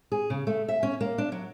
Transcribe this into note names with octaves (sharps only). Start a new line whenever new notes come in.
G#4
C#3
A3
E5
C#4
A#3
D4
F#3